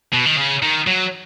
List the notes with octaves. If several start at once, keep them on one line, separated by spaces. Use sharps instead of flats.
B2
D#3
C#3
D#3
F#3